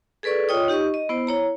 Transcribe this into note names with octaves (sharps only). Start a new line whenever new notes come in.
G#4 A4 B4 D5 C#6
F4 C#5 D#5 G5 C#6 D#6
D#4 G4 D#5 C#6
D#5
B3 E4 C5
E4 C#5 A#5